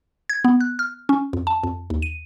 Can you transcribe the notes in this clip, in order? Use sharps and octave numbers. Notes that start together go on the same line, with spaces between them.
G#6
B3
F#6
F6
C#4
F2
A5
F2
D#2
D#7